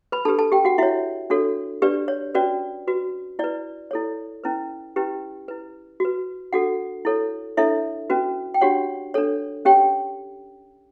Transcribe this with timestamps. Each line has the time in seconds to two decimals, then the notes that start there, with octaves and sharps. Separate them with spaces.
0.12 B4 B5
0.25 D4 G4 A4 B4 A5
0.39 A4 A5
0.52 G4 G5
0.65 F#4 F#5
0.78 E4 F#4 C#5 E5
1.30 D4 F#4 A4 C#5
1.82 D4 G4 B4 D5
2.08 C#5
2.35 C#4 F#4 B4 D5
2.88 F#4 B4
3.39 E4 B4 D5
3.91 E4 A4 C#5
4.44 C#4 E4 B4
4.96 C#4 E4 G4 B4
5.48 E4 B4
6.00 F#4 B4
6.53 D4 F#4 A4 F#5
7.05 E4 A4 C#5
7.57 D4 E4 A4 C#5 E5
8.10 C#4 F#4 B4
8.54 G5
8.61 D4 F#4 G4 C#5 F#5
9.14 D4 A4 C#5
9.65 C#4 G4 C#5 G5